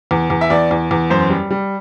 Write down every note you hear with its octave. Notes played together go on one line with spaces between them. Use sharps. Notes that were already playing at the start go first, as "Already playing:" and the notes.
E2
E2
E5
E2 D5
E2
E2
F#2 C5
G3
G3